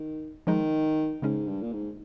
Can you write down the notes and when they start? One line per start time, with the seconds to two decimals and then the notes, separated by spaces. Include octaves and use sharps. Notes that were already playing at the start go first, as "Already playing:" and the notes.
Already playing: D#3
0.47 D#3 F3 G#3 D#4
1.22 G#2 C#3 G#3 C#4 G#4
1.48 G2
1.62 A#2
1.72 G#2